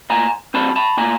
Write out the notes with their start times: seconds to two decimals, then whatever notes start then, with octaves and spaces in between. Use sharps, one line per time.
0.10 A#2 G#5 A#5
0.54 G3 C4 A5 B5
0.76 A5 B5
0.97 A#2 G#5 A#5